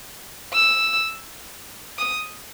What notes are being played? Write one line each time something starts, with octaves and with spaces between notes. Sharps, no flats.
E6
D#6